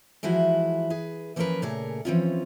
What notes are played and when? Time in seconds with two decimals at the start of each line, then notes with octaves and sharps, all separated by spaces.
0.23 E3 F3 G#3 E4 F#4
0.90 G#4 B4
1.36 E3 F3 A#3 C#4 A#4 B4
1.62 A#2 C#3 A3 G#4 A#4 C#5
2.05 E3 F3 C4 C#4 D#4 F4